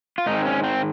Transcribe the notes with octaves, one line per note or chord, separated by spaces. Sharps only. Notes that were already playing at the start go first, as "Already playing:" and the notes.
F4
G#2 D#3 G#3 C4 D#4
C#4
C4